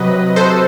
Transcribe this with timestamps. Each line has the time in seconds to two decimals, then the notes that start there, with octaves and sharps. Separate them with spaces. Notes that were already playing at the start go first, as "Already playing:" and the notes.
Already playing: C3 F#3 B4 D#5
0.36 A4 C5